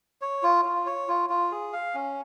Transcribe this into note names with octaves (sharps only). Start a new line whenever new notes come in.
C#5
F4
F4
C#5
F4
F4
G#4
F5
C#4